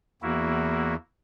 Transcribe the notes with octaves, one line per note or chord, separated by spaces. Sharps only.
E2 A#3 E4 F#4